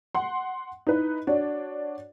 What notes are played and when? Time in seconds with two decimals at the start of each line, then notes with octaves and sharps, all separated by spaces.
0.15 F#5 C6
0.87 D#4 E4 B4
1.27 D4 F#4 C#5 D5